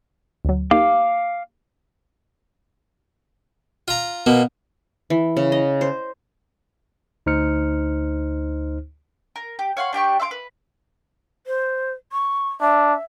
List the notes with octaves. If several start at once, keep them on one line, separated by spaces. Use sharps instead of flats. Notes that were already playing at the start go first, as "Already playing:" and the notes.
D2 F#3
A#3 D#4 G4 F5 D6
F4 A#5
B2 A#3 B3
E3
C#3
D#5
C5
D2 D#4 C5 F6 C#7
A#4
G4
C#5 F5 F#5 C6
D4 G4 G5 C#6
E5 F5 C6 D6
B4
C5
C#6
D4 E5